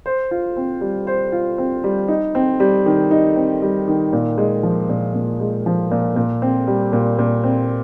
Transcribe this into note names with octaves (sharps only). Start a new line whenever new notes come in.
C5
F4
C4
G3
C5
F4
C4
G3
D#4
C4
G3
D#3
D#4
C4
G3
D#3
A#2
G#3
F3
A#2
A#2
G#3
F3
A#2
A#2
C4
G3
A#2
A#2
C4